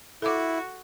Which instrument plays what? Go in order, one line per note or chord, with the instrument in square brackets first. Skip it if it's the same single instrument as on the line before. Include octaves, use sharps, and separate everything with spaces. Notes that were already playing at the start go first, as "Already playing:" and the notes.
[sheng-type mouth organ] E4 [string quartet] F#4 [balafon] A4 D6